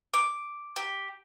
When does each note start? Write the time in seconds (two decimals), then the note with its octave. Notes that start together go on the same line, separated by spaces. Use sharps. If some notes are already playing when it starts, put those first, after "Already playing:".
0.14 D6
0.76 G4